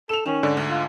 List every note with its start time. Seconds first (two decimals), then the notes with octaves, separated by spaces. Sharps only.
0.09 A4 E7 F7
0.26 D#3 C#4
0.43 G#2 D3 D4
0.57 D2
0.69 F4